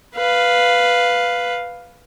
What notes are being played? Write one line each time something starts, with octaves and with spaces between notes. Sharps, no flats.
B4 F5